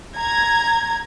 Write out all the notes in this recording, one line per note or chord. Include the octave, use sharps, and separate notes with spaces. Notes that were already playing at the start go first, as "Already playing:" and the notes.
A#5 G#6